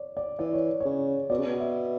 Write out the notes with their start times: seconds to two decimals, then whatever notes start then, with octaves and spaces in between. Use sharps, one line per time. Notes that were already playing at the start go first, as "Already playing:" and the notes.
Already playing: C#5 D5
0.17 D5
0.39 E3 D5
0.53 C#5
0.80 C#3 C#5
1.30 B2 D5
1.38 C#3
1.45 B2
1.60 E5